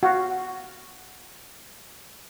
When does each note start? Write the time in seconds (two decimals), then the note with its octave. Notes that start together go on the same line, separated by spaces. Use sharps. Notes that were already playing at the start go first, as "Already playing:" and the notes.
0.03 F#4 F5